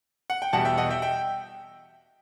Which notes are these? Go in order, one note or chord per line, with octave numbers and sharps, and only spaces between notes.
F#5
G5
E2 B2 G3 F#5 A5
E5 G5
D#5 F#5
E5 G5
E5 G5